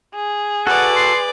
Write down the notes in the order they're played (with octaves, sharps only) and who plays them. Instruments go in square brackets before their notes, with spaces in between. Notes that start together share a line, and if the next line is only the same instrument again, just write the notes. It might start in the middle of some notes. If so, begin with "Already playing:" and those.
[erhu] G#4
[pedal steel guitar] F#4 A4 [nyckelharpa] B4 D5 [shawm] F#5
[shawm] C6